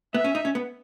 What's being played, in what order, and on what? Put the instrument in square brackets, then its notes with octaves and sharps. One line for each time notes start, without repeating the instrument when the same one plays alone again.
[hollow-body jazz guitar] B3 [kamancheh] E5
[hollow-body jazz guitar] C#4
D#4
C#4
B3